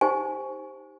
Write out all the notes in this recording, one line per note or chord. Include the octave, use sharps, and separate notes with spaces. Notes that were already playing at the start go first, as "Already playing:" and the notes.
D#4 G4 C5 G#5